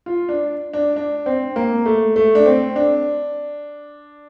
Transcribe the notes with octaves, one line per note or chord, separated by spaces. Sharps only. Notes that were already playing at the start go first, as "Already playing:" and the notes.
F4
D4
D4
D4
C4
A#3
A3
A3
D4
C4
D4